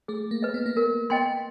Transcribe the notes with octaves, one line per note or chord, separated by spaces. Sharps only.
A3 G#4
A#3
B4 D#5
B3
A#3
B3 A#4
B3 D#5 G5 C6